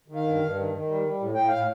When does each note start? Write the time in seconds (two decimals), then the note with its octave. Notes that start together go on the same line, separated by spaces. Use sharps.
0.08 D#3
0.15 F5
0.24 G2
0.39 G2
0.56 D#3
0.71 D#3
0.87 G3
1.03 G3
1.19 A2
1.35 A2 G5
1.48 A2 F5